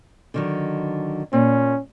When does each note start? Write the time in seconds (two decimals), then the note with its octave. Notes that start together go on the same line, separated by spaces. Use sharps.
0.34 D3 D#3 F#3
1.33 A#2 C#4